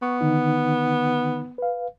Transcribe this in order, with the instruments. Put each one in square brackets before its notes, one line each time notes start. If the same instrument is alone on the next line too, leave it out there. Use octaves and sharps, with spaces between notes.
[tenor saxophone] B3 [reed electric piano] C#6
[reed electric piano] D3 D#3 D#4
B4 F5